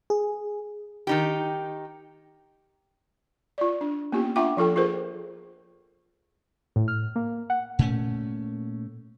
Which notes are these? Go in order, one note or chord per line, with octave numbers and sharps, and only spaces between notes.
G#4
D#3 D#4 G4
F4 D5
D4
A#3 B3 C#4 F4 G4
D4 F4 E5 F#5 G5 D6
F3 F4 A4 G5
F4 G#4 A#4 C5
A2
F6
A#3
F#5
A#2 A3 C#4